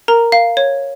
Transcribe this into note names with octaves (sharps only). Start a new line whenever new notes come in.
A#4 A#5
F5
C#5